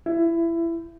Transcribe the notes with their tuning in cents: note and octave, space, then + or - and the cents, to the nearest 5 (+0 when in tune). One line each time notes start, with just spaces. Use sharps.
E4 +20